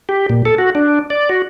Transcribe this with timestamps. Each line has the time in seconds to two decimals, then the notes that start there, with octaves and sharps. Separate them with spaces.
0.09 G4
0.29 A#2
0.45 A4
0.58 F#4
0.75 D4
1.10 D5
1.29 F#4